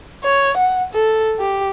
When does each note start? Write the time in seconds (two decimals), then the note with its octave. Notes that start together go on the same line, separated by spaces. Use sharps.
0.24 C#5
0.57 F#5
0.93 A4
1.39 G4